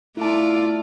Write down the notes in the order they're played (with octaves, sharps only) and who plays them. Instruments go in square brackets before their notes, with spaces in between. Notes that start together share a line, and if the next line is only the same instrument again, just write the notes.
[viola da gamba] A3 F4 D5 [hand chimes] E4 A5